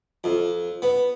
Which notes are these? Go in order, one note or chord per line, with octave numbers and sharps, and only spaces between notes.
F2
B3